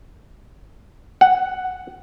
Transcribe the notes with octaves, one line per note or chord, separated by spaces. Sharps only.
F#5